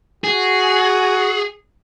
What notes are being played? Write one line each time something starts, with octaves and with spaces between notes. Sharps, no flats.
F#4 G#4